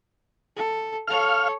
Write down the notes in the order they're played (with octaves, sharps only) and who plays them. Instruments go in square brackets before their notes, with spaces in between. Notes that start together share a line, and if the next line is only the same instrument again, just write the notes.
[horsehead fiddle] A4
[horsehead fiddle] A4 C#5 [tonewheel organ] F5 F6